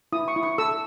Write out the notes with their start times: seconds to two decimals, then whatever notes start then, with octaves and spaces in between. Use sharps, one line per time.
0.12 E4 D#6
0.28 C#6
0.36 E4
0.43 C#6
0.58 A4 E6